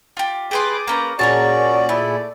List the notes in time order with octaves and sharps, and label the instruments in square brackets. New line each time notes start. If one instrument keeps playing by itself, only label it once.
[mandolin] F4 G4
[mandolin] G4 B4 C6 [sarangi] G#4 [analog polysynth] D6 G6 A6
[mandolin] A#3 C#4 B4 [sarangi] A#5
[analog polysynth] A#2 G#4 [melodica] C#4 F#4 [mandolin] A#4 C#5 A5 [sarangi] D5
[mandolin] A3 [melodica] E4